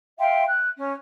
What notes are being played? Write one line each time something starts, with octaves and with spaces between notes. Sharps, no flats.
E5 F5 G5 C6
F#6
C#4